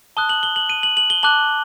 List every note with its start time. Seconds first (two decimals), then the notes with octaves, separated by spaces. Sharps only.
0.17 A5 D#6 F#6 G7
0.29 F#7
0.43 G7
0.56 F#7
0.69 D#7
0.83 F#7
0.97 F#7
1.10 G7
1.23 A5 D6 F#6 F#7